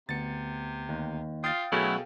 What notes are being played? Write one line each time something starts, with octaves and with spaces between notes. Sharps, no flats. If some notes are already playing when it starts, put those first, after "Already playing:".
D2 C3 B3 A6 C#7
D#2
F4 F5 G5 D#6 A6
B2 F#3 A3 C#4 E4 G#4 A4